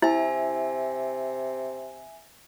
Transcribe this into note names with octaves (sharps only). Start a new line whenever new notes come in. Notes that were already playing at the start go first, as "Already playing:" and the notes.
C3 E4 E5 G#5